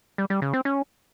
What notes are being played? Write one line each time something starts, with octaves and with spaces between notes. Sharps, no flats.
G3
G3
C#3
C4
C#4